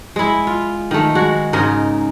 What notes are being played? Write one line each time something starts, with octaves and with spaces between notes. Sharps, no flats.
G#3 E4
F4
D#3 A3
G#3 F#4
G#2 C#3 D#4 A#4